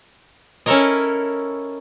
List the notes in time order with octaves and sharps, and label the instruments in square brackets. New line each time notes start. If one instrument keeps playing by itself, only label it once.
[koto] C#4 E4 A4 A#4 C#5 D#5